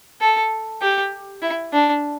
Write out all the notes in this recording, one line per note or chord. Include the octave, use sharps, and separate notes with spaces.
A4
G4
E4
D4